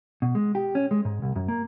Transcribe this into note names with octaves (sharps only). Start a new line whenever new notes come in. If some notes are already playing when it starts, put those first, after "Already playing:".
B2
G#3
G4
C#4
G#3
G#2
C2
F#2
A#3